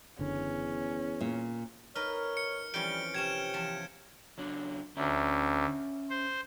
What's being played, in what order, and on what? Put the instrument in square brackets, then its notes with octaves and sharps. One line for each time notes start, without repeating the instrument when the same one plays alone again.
[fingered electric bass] F#1 D3 [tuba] E2 [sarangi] C#4
[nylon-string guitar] A#2
[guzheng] D#4 A#4 B4 [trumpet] C#5 [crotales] F6
[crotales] C#7
[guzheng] F2 E3 C#4 [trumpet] G3 [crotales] G6 D7 G7
[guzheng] C3 C#4 [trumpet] G4 [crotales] G#6 E7
[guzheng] E2 E3 F3 [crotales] E7
[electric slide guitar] C#3 F#3 D4
[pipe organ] D2 [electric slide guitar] C#4 E5
[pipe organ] C5